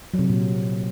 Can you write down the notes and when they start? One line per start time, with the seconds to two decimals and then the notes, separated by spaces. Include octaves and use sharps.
0.14 F#3
0.19 C3
0.24 F#3
0.29 A#2